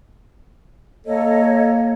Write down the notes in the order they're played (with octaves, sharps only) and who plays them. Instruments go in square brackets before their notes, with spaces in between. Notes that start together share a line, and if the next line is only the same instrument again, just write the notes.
[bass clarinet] A#3 [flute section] A4 C#5 D#5